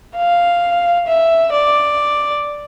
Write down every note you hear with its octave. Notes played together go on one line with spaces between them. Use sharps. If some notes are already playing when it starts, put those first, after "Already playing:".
F5
E5
D5